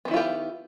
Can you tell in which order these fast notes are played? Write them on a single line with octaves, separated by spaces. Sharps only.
B3 D#3 E4 F4 G4